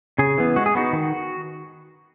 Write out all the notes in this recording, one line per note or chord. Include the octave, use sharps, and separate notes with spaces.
C#3 G#4
E3 B3
G#3 F#4
G#4
B3 D#4 F#4
D#3